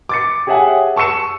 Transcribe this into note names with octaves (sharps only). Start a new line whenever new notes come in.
D6 A6 C#7
G4 G#4 C#5 E5 F#5 G#5
A5 C#6 E6 C#7 E7